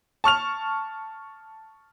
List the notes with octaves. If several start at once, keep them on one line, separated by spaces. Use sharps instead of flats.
A5 C#6 F6 F7